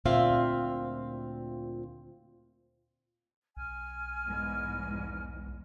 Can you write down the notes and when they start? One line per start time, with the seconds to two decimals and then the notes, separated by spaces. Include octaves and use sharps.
0.05 D2 A#2 C4 F4 E5 F5
3.57 B1 G#5 F6
4.26 E2 G#2